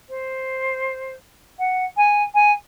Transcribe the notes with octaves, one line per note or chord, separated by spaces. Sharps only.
C5
F#5
G#5
G#5